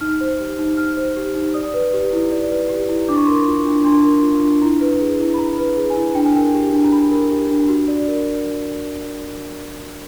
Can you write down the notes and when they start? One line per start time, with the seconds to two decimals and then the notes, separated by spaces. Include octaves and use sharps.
0.01 D#4 F6
0.21 C5
0.40 G4
0.59 D#4
0.77 D#4 F6
0.97 C5
1.16 G4
1.35 D#4
1.54 D5 D#6
1.74 B4
1.94 G4
2.13 E4
2.32 D5
2.51 B4
2.69 G4
2.89 E4
3.08 D4 D6
3.16 C#6
3.26 A#4 C6
3.34 C#6
3.46 F4
3.66 D4
3.84 D4 C6
4.04 A#4
4.23 F4
4.43 D4
4.62 E4 A#5
4.81 B4
5.00 G#4
5.20 E4
5.34 B5
5.38 E4 A#5
5.58 B4
5.77 G#4
5.90 G#5
5.96 E4
6.15 D4 G5
6.25 G#5
6.35 A#4 G5
6.54 G4
6.73 D4
6.84 A#5
6.92 D4 B5
7.11 A#4
7.30 G4
7.50 D4
7.69 F#4
7.88 D5
8.08 A#4